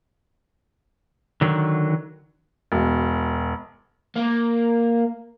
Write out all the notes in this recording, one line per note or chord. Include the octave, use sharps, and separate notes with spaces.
D3 D#3 F#3
E1
A#3